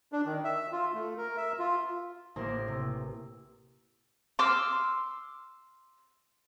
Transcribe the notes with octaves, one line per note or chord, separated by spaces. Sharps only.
D4
D#3
E5
F4
A3
A#4
E5
F4
A1 A#3 A#4 C5
C3
C6 D6 E6 F6